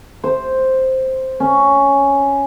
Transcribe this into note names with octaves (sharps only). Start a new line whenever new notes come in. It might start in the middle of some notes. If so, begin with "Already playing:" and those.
C5
C#4